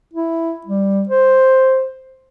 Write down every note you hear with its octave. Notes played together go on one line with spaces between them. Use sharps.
E4
G3
C5